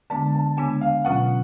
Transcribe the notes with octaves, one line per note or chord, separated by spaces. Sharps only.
D3 G#3 B3 D4 A5
A5
C#3 G#3 B3 D4 G#5
F5
B2 F#3 C#4 F4 F#5